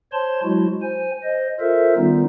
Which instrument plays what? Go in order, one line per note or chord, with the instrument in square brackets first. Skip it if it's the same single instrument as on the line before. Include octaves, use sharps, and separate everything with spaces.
[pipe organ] C5 C#5 A5 C6
F#3 G#3 E4 F#4
C5 G#5
C5 D#5
F4 A4 A#4 C5 E5
D#3 G3 B3 C#4 D#4 F4